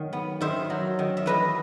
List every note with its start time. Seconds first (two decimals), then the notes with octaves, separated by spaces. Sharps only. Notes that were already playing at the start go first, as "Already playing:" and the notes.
Already playing: D#3 F#3
0.13 B3
0.41 D#3 C5 E5
0.70 F#3
0.99 D#3
1.17 E5
1.26 E3 B4 D#5